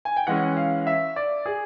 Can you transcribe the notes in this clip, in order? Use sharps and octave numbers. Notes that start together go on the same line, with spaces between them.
G#5
G5
E3 G#3 C#4 F#5
F5
E5
D5
G#4